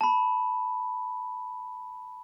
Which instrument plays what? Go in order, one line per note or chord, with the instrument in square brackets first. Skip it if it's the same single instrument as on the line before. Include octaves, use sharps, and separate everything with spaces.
[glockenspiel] A5 B5